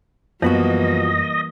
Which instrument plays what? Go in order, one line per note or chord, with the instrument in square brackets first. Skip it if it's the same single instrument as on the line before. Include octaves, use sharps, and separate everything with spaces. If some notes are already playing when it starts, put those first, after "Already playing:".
[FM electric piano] F#2 [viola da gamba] E3 G3 A#3 [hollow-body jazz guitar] F3 B3 F#4 [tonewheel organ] D#5